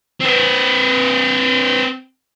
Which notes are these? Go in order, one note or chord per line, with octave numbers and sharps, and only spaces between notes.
C4 B4